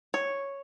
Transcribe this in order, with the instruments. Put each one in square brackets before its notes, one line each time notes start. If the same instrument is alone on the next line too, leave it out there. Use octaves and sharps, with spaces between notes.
[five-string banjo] C#5